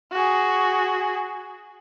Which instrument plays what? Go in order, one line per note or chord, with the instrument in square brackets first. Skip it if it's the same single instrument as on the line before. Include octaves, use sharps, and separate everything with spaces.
[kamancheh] F#4 G#4